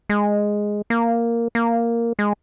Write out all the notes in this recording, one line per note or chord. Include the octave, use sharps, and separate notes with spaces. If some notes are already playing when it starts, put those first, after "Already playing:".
G#3
A#3
A#3
G#3